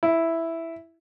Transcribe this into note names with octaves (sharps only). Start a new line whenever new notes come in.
E4